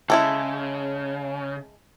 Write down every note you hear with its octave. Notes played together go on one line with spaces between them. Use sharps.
C#3 G#3 E4 A4